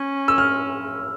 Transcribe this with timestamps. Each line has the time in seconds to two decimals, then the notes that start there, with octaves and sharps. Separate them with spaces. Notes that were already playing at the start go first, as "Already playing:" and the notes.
Already playing: C#4
0.28 E6
0.38 F6